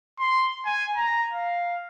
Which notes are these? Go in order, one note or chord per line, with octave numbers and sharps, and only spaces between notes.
C6
G#5
A#5
F5